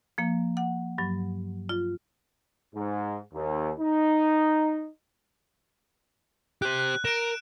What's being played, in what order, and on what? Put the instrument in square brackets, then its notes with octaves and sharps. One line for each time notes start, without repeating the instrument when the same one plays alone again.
[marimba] F3 A#3
F#5
G2 F#3
F4
[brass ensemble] G#2
D#2
D#4
[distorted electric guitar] G4 C5 [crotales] F#6
[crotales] F#6
[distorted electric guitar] A#4 [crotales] D7 E7